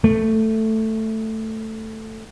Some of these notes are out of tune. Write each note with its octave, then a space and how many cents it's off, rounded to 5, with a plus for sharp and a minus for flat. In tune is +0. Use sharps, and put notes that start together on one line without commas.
A3 +5